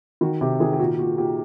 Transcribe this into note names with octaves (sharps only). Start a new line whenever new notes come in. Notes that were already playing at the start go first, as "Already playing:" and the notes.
D#3 F#4
C3 G4
D#3 G#4
G4
A#2 F#4
A#2 F#4
A#2 G4